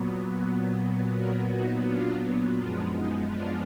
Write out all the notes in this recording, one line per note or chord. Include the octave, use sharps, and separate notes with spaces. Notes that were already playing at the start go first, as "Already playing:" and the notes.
Already playing: A#2 F#3 B3
F#4 A#4
D#4 F#4
D4 F4
F#2 F3 G#3 B3 D4 F4
D#4
D4 F4